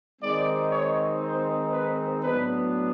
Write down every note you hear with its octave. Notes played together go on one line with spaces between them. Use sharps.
D#3 G#3 C4 D#4 D5
C#5
C5
B4
A2 F#3 B3 D4 B4